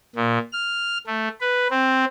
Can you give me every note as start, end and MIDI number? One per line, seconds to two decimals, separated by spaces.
0.16 0.38 46
0.52 0.97 89
1.06 1.28 57
1.41 1.67 71
1.70 2.05 60